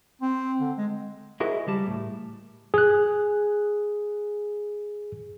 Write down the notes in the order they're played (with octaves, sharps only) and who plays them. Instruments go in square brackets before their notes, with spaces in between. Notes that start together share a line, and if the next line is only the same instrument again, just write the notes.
[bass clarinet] C4
D3
G#3
[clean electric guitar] E4 F#4 G#4 A#4 C5 D#5
C#2 G3 A5
A2
[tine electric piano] G#4 F#6